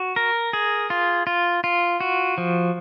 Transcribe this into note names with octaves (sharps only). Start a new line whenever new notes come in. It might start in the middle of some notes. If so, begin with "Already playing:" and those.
Already playing: F#4
A#4
G#4
F4
F4
F4
F#4
F3